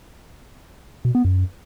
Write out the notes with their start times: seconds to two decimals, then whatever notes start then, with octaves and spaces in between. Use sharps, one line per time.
1.05 B2
1.15 B3
1.25 F#2